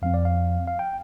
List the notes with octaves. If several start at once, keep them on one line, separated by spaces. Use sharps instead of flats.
F2 F3 C4 F5
D5
F5
F5
G5